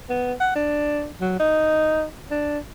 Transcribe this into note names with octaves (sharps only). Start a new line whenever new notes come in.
B3
F#5
D4
F#3
D#4
D4